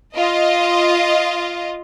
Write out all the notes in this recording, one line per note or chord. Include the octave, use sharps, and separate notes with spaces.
F4 D#5